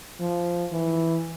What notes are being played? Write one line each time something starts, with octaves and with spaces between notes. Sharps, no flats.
F3
E3